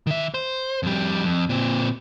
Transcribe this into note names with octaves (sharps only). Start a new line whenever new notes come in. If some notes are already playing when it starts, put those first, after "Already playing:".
D#3 E5
C5
F2 G3
F2
A#2 C4